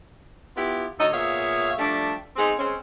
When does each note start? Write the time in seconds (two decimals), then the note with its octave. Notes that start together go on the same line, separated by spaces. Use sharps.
0.57 B3 E4 F4 G4
0.99 D2 F#4 A4 C#5 D#5
1.13 A#2 B3 G#4 C#5 E5 F5
1.78 F3 G3 A3 D4
2.36 G#3 B3 C4 D#4 G#4
2.58 G#3 C4 C#4